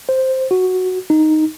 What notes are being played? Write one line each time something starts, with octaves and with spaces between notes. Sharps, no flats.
C5
F#4
D#4